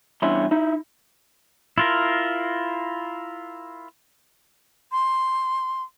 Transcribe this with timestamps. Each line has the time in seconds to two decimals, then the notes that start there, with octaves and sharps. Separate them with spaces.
0.22 E2 G2 C#4 E4 C6
0.51 D#4 E4
1.78 E4 F4 A#4
4.92 C6